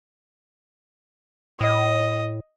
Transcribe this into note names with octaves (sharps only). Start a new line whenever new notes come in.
A2 D#5